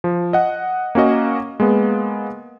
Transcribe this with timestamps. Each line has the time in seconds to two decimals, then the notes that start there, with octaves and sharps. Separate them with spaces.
0.04 F3
0.33 D#5 F#5
0.95 A#3 C#4 F#4 D#5
1.60 G#3 A#3 B3